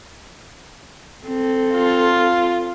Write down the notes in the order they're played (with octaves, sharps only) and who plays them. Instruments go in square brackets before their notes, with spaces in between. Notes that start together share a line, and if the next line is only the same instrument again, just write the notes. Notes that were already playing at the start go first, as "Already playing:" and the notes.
[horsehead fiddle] C4 A4
[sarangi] F4